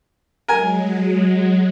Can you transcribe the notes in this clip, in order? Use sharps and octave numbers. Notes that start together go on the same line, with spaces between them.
F#3 G#3 A#4 G#5